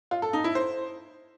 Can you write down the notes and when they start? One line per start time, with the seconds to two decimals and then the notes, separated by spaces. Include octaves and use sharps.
0.11 F4
0.22 A4
0.33 D#4
0.44 E4
0.55 C5